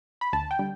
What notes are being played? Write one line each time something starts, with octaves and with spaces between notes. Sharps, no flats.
B5
D2 A5
G5
D3 G3